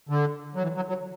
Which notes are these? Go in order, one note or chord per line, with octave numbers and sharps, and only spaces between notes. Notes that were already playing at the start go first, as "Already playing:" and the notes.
D3
F#3
E3
F#3
F#3